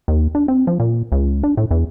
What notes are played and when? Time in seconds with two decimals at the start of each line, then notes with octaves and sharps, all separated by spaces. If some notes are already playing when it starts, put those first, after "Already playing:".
0.08 D#2
0.35 D4
0.48 C4
0.67 F3
0.80 A#2
1.12 C#2
1.43 D4
1.57 A2
1.71 E2